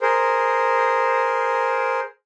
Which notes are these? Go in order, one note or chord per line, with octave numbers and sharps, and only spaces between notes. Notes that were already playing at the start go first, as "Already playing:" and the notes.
G#4 A#4 C5